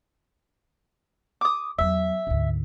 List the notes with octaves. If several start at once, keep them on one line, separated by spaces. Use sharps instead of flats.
D6 D#6
E2 F#3 E5
D2 G#2